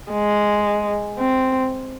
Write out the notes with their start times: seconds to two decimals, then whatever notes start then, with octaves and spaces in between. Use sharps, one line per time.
0.12 G#3
1.19 C4